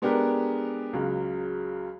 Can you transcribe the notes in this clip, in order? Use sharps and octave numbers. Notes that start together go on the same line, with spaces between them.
G#3 B3 D4 G4 A#4
C#2 C#3 F#3